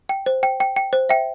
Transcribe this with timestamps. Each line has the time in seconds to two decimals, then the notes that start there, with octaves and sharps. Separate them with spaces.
0.09 G5
0.26 C5
0.43 G5
0.60 G5
0.76 G5
0.93 C5
1.09 E5 G5